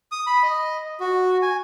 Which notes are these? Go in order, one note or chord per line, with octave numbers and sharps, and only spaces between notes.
D#6
B5
D#5
F#4
G#5